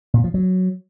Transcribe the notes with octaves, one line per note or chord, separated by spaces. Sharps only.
A#2
F3
F#3